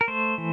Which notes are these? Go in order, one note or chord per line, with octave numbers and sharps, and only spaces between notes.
A#4
A3 C5
E3